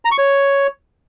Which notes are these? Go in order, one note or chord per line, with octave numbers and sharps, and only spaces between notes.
A#5
C#6
C#5